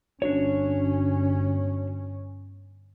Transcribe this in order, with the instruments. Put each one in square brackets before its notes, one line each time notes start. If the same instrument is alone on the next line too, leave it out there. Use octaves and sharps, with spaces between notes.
[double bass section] G1 C#4 [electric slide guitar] D4 F#4 C#5